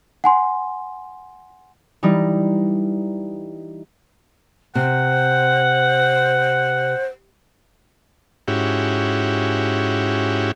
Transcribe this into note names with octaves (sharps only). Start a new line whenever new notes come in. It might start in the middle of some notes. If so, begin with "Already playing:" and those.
F#5 G#5 C6
E3 G3 D#4
C3 C5 F#5
G#2 C#4 E4 F#4 G4